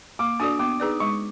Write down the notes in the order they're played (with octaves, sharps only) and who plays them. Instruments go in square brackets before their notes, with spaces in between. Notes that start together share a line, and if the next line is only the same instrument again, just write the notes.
[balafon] A#3 [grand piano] D6
[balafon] D4 F#4 A4 D5 [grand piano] D#6
[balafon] B3 [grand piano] D6
[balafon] D#4 G#4 B4 D5
[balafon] G#3 [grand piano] C#6